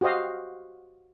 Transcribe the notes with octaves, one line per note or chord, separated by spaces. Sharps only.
F#4 G4 C5 D#5 F5